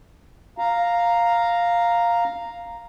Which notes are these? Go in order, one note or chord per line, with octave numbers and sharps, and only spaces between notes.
F5 A#5